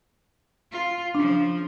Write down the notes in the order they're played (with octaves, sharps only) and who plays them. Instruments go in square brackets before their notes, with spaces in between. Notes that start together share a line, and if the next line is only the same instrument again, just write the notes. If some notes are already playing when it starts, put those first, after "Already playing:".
[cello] F4
[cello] C#3 F3 [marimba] D4